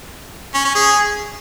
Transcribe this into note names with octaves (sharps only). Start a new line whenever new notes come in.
C#4
C#4
G#4